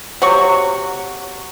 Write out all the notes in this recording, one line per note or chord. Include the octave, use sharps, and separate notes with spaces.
C3 F#3 F#4 C#6